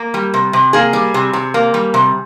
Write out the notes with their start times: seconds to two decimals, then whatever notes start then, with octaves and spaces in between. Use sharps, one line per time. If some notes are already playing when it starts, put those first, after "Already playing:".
Already playing: A#3
0.14 G3
0.34 C3
0.53 C3
0.73 A#3 G#4
0.93 G3
1.14 C3
1.33 C3
1.54 A#3
1.74 G3
1.94 C3